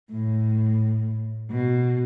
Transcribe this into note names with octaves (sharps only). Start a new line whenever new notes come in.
A2
B2